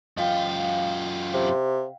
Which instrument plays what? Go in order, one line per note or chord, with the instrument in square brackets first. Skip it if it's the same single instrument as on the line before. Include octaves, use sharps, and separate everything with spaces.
[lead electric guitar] F#2 F4 [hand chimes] D#5 F5 G5
[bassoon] C3